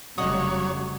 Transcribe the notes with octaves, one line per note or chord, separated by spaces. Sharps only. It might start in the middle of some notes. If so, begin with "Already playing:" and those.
F1 C#3 F#3 G3 C#5 D#5 F#5 D#6